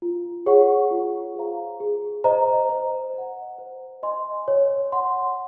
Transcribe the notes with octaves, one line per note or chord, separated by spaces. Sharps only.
F4
G#4 C#5 F#5 C#6
F4
G#4 C5 F5 A#5
G#4
C5 D#5 A#5
C5
D#5 F#5
C5
D#5 G#5 C6
C#5
F#5 C6